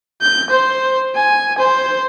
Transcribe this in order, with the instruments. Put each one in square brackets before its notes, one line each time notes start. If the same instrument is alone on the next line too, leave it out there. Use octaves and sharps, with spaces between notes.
[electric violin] G6
C5
G#5
C5